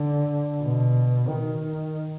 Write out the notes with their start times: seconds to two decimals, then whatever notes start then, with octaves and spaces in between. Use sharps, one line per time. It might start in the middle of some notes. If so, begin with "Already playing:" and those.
Already playing: D3
0.63 B2
1.29 D#3